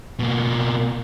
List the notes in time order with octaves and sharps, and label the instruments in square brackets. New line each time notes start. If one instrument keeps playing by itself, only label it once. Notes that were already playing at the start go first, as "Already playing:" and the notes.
[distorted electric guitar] B2 A#3